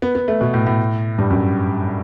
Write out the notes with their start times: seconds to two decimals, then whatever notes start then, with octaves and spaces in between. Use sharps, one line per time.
0.02 B3
0.15 B3
0.28 A3
0.41 B2
0.54 A2
0.67 A2
1.18 G2
1.30 F#2